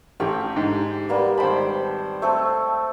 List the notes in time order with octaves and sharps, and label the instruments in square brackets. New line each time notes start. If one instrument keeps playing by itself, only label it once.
[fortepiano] A1 [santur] G4 G5 A#5
[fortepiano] G#2 D3
[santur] G3 A#3 B3
[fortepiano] G#1 C5 B5 [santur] G5 A5
[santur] A3 C4 A4